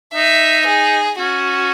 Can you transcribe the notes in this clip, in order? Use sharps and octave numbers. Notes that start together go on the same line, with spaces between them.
D#4 E5
G#4
C#4 F#4